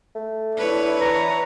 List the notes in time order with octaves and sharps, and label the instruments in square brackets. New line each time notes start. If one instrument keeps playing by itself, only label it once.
[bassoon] A3
[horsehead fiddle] D4 E4 [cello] B4 C#5
[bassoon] E3 [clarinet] A#5